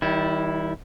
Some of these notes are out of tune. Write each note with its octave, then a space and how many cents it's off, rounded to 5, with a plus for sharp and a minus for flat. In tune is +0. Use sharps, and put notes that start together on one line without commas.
D#3 +30 G3 -20 E4 +0